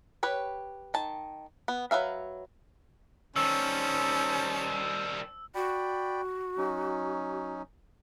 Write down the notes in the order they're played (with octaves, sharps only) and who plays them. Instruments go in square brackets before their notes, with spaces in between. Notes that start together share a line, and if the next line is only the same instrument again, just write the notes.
[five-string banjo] G4 B4 C#5
D#3 A5
B3
F#3 B4 E5 F5
[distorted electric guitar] D#3 G3 [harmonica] C#4 [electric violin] C5 A5 [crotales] E6
[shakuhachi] F#4 [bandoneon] D5 G5 B5
[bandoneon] F#3 C#4 D#4